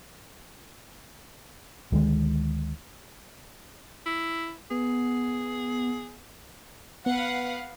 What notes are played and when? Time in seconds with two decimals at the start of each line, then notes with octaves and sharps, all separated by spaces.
1.92 D2 D#3 E3 G#3
4.06 E4
4.71 B3 G#4
7.06 B3 B4 F5 F#5